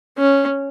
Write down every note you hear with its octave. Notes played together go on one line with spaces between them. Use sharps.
C#4